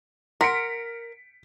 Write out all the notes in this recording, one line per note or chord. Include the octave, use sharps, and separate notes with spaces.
A#4 F#5 C6 B6 C#7 D7